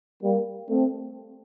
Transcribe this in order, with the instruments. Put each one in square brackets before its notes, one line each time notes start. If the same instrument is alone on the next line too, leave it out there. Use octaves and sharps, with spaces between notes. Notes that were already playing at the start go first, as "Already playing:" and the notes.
[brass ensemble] G3 A#3
A3 C4